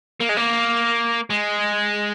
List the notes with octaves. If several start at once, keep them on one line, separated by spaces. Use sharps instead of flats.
A#3
G#3
A#3
G#3